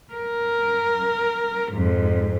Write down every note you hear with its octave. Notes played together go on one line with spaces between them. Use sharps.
A#4
F2 G#2